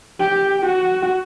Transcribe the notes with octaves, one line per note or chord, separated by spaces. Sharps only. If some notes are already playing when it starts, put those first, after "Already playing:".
G4
F#4